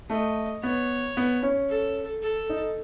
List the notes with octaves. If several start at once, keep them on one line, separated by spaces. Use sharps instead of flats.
A3 D#5
B3 C#5
B3
C#4
A4
A4
D#4